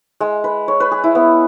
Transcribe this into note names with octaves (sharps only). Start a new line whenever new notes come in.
G#3
B4
C#5
B4
G#4
E4
B3